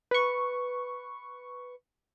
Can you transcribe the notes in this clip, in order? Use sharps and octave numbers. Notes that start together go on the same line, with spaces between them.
B4 C#6